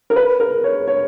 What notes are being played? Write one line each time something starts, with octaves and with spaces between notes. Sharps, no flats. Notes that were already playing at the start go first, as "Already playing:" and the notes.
A#4
B4
A#4
C#5
C#5